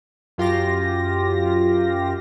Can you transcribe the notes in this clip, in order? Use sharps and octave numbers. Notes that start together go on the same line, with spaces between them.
F#2 F4 G4 A#6